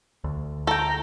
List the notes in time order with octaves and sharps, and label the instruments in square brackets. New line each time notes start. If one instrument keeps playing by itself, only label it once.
[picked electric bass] D2
[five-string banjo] A4 G5 [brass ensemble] A#5